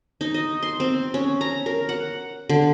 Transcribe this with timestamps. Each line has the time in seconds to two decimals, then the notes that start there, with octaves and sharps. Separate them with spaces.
0.21 D#4
0.34 D#5
0.63 C6
0.80 C4
1.14 C#4
1.41 A#5
1.66 A#4
1.89 F#5
2.49 D3